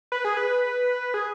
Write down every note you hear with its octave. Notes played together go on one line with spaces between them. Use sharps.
B4
G#4
B4
G#4